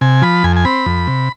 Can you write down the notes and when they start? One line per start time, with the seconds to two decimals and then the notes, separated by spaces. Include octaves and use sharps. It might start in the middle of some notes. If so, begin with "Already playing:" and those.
0.01 C3 G#5
0.22 F3 B5
0.44 F2 G#5
0.56 G#5
0.65 C4 B5
0.86 F2
1.07 C3